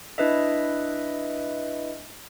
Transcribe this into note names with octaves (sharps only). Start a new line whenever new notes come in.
D4 E4 B4 D#5 E5